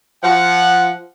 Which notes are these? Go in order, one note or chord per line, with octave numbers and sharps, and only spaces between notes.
F3 F#5